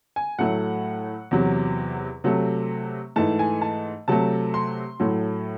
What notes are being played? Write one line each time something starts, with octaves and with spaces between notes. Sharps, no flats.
G#5
A2 F#3 A3 F#5
E2 C3 F#3
C3 F#3 A3
G#2 E3 A3 A5
G#5
A5
C3 F#3 A3 A5
C6
A2 F#3 A3